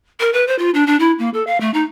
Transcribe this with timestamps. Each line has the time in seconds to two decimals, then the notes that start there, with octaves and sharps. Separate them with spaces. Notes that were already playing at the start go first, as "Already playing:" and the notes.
0.20 A#4
0.33 B4
0.47 C5
0.59 F4
0.74 D4
0.87 D4
0.99 E4
1.19 A#3
1.34 A4
1.47 F5
1.60 A3
1.74 D#4